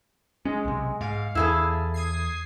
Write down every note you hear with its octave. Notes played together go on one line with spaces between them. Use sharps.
G#3 C#4
B1 C3
G#2 F5
E2 E4 G#4 A4
D#6 G#6 C7